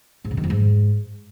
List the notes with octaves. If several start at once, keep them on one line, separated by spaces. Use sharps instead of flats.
G#2
C#3
D#3
F2
G#2